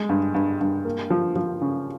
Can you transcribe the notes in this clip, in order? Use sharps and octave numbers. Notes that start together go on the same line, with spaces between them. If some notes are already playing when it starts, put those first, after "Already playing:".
Already playing: G#3
G2
G2
G2
A#3
F3
F3
C#3